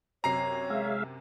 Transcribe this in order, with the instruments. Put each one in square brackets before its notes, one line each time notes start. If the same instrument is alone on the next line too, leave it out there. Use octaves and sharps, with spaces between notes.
[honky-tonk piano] F#2 C3 C7 [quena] C#5 [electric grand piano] A#5
[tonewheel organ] G#3 E5 F5